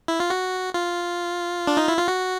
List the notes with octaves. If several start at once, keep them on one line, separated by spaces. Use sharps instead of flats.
E4
F4
F#4
F4
D4
D#4
E4
F4
F#4